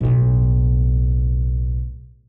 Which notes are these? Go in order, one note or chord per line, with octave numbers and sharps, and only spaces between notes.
B1 A2